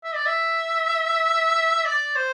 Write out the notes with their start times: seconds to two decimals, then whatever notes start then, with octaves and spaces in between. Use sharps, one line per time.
0.04 E5
0.15 D5
0.26 E5
1.85 D5
2.16 C5